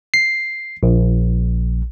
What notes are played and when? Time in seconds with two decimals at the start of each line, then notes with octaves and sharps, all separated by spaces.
0.14 C7
0.83 A#1